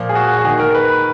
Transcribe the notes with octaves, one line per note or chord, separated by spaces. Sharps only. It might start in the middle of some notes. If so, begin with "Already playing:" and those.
Already playing: A#2 F3 A#3
G#4
F#4
F#4
D#3 A#3 G#4
A#4
B4